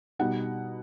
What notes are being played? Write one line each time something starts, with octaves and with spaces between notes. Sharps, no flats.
B2 G3 D#4 F#5